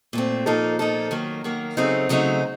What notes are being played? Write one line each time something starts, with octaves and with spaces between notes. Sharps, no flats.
A#2 A3 C4
A#2 F3 A#3 D#4 A4
A#2 F3 A#3 D#4 A4
D#3 F#3 A#3
D#3 F#3 A#3
C#3 F#3 A3 C4 D#4
C#3 F#3 A3 C4 D#4